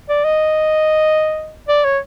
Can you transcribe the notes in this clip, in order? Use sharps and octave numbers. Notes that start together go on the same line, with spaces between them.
D5
D#5
D5
C#5